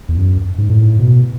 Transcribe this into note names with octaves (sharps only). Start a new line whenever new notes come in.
E2
F#2
G#2
A2
B2